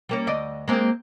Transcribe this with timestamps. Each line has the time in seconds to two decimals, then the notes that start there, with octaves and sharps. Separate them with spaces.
0.09 G3 A#3 C#4
0.27 D2 D5 D#5
0.68 G#3 A#3 C4